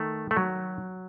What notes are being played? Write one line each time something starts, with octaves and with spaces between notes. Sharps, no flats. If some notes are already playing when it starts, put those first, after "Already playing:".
Already playing: D#3 A3
A3
F#3